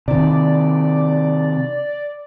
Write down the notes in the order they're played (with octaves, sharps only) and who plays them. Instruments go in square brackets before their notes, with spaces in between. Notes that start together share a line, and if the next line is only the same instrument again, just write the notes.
[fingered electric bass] C3 D#3 [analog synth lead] D5